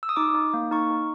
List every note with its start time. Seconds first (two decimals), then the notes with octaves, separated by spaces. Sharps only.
0.03 E6
0.09 D#6
0.16 D#4 D6
0.34 D#4
0.54 A#3
0.71 D#4 C#6
0.91 D#4